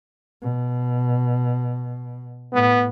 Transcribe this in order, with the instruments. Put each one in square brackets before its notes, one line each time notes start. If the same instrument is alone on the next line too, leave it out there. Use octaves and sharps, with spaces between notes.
[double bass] B2
[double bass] A2 [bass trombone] B3